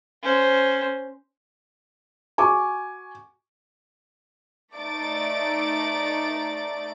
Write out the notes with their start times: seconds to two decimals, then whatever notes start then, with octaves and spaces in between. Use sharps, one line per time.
0.23 C#4 C5
2.38 F#4 G#5 C#6 D6
4.74 A3 D#4 D5 D#5 A6 D7